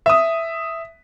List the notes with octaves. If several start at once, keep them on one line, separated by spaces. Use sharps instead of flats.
E5 D#6